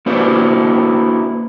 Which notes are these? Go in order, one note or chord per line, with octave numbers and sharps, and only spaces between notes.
A#3 D4 E4 F#4 B4 C5